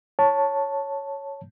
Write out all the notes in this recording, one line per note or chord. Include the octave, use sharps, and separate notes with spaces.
C#5 A5